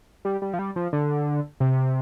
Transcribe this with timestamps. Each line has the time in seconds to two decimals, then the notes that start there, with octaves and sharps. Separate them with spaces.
0.25 G3
0.42 G3
0.53 F3
0.59 G3
0.76 F3
0.93 D3
1.60 C3